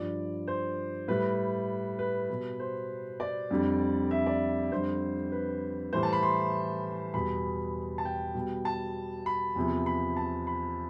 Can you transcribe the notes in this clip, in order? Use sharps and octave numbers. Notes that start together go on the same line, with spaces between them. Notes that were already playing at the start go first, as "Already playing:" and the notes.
Already playing: G2 F3 D5
C5
A2 G3 B4
B4
B2 G3
C5
D5
F2 D3 G3
E5
D5
F2 D3 G3 C5
B4
A2 E3 G3 C5
A5
B5
C6
E2 B2 G3 B5
A5
G5
B2 G3
A5
B5
E2 C3 F3
B5
A5
B5